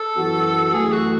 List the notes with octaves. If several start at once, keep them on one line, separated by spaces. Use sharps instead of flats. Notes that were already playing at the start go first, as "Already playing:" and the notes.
Already playing: A4
F#2 E3 B3 F#4
F#2 E3 A3 G#4
F#4